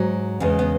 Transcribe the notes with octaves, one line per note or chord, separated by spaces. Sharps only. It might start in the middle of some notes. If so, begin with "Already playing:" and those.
Already playing: G#2 F#3
E2 C#3 G#3
B3